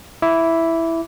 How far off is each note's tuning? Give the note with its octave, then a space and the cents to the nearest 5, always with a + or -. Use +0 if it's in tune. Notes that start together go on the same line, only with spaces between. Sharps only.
E4 +0 E5 +0 D6 -20